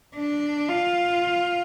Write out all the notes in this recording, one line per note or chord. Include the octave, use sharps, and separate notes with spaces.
D4
F4